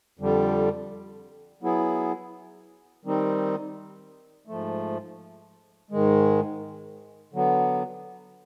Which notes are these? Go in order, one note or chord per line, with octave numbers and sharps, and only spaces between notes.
F2 D3 G3
F#3 B3 E4 G#4
D#3 G3 C4 D#4
G#2 F3 A3
G#2 D#3 G#3
D3 F#3 B3